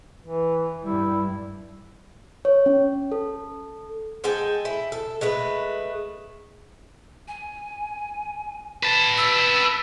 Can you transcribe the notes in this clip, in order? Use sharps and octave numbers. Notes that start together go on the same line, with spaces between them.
E3
G2 G3 E4
C#5
C#4
A4
G#3 A4 G5 G#5
E4
A4
G#3 A3 B4
G#5
B4 A5
E6